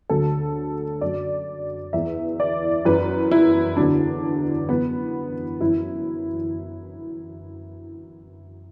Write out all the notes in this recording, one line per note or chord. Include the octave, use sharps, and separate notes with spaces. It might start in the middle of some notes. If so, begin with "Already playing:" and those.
D2 D3 F#3 A4
F#2 F#3 D5
E2 E3 E5
D5
F#2 E3 B4
E4
E2 D3 F#3 D4
F#2 E3 B3
F#2 E3 E4